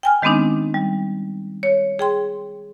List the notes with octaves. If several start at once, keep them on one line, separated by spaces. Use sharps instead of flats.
G5 G#5 F6
D#3 G#3 B3 C4 D4 D#4
G3
C#5
G#4 G5 C6